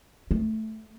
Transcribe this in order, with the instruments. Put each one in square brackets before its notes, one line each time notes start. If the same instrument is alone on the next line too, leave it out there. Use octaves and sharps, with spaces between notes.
[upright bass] A3